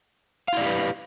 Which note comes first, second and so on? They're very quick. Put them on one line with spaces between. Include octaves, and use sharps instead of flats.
F5 E4 D5 G4 B4